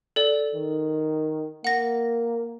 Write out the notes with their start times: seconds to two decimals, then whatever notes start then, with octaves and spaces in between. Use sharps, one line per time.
0.16 A4 D5
0.55 D#3
1.64 A#3 F#5 A#6